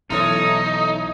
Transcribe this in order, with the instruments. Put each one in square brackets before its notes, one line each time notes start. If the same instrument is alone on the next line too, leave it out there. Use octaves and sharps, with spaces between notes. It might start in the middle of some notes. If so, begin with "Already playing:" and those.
[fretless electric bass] B1 E3 [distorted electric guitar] D#4 [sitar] E4 A4 C#5 [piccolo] D#6